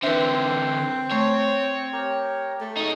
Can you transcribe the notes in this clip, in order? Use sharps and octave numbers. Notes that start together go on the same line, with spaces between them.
D3 E3 C4 B4 C5 E5
A3 C#5
G4 A#4
A3
F#3 D#4 G#4